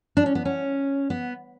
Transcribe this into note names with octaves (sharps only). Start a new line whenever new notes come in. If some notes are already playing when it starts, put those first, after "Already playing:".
D4
C#4
B3
C#4
B3